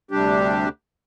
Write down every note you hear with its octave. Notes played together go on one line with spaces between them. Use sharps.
D2 C3 G3 D4 G4